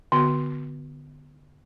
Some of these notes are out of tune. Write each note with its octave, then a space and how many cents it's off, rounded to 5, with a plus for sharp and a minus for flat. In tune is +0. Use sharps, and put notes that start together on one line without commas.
D3 +0 B3 +5 F#4 +0